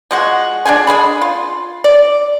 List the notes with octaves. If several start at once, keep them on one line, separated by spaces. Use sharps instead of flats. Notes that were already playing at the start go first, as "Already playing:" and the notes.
F3 G#3 F#4
D4 E4 G#4 G#5
G#3 B3 G#4 B5
F4
D5